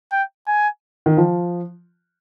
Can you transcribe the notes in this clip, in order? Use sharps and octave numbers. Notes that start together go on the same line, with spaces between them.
G5
G#5
D#3
F3